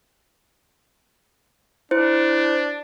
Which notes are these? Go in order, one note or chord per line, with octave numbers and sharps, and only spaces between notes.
D4 E4 C5